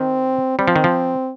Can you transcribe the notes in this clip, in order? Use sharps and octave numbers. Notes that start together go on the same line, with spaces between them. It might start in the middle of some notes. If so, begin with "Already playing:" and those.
Already playing: D#3 C4
G3 C4
F3
D#3
F3